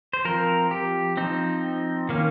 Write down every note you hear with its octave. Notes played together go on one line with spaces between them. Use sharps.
C5
F3 C4 A#4
G4
F3 C4 D#4
D#3 A#3 C#4